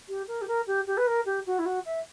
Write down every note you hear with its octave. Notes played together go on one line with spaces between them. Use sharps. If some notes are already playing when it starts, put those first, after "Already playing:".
G4
A#4
G4
A#4
G4
G4
B4
A#4
G4
F#4
E4
F#4
E5